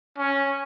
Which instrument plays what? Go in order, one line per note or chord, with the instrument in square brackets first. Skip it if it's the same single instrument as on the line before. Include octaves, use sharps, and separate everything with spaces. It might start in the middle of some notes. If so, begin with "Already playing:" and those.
[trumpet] C#4